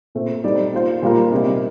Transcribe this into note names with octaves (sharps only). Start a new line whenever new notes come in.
A#2 A3 C4
G3 C4 D#4 A4 D5
A#3 F4 C5
A#2 G3 A#3 F4 A#4
C3 D#3 G3 A#3 D#4